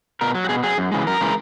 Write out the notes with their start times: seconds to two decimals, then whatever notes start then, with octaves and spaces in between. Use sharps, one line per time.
0.21 B2 A#4
0.35 F#3
0.44 F#4
0.49 B2 G#4
0.63 F#3 G#4
0.78 F#2
0.92 C#3 E3 G#3
1.07 F#2 A#4
1.20 C#3 E3 G#3